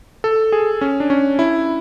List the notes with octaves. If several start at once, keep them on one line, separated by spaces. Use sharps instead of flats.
A4
G#4
C#4
D4
C#4
E4